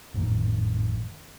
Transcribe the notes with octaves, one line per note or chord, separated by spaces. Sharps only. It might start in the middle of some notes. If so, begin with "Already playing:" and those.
G#1 F2 A2 D#3